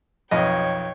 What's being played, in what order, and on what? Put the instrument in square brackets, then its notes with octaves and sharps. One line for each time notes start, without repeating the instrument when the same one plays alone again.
[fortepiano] B1 F2 D#5 [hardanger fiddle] C#5 G5